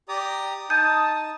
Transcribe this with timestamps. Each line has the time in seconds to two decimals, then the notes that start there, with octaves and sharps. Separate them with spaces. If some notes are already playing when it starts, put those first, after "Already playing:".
0.08 G4 D5 A#5 D#6
0.70 D#4 A5 D#6 G6